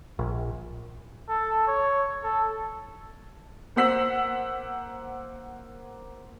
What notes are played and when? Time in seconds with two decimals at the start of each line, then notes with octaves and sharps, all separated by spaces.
0.19 A#1
1.29 A4
1.67 C#5
2.23 A4
3.76 A#3 C5 F#5 E6 B6 F#7